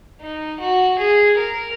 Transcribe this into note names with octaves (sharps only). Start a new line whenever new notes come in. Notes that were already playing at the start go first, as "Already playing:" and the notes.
D#4
F#4
G#4
A#4